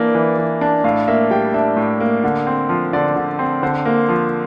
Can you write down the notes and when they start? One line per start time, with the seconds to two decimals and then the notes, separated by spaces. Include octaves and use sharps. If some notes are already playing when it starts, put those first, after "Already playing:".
Already playing: E3 A#3 D4 D5
0.15 E3
0.38 E3
0.61 D4
0.84 A2 F5
1.08 A#3 E5
1.31 G3 G5
1.54 D4 E5
1.77 A2
2.00 A#3
2.24 D3
2.47 C4
2.69 F3
2.93 D3 D5
3.16 D3
3.39 C4
3.63 D3 C5
3.85 A#3
4.09 F3